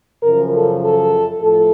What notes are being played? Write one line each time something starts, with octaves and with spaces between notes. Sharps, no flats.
F#2 C#3 F3 A#4
A4
A4
A2 F3 A4